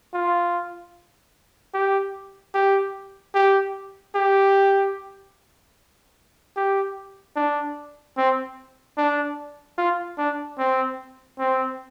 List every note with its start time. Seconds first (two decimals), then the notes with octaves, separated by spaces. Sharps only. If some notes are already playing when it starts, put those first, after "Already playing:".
0.14 F4
1.74 G4
2.54 G4
3.35 G4
4.15 G4
6.56 G4
7.36 D4
8.17 C4
8.97 D4
9.78 F4
10.18 D4
10.58 C4
11.39 C4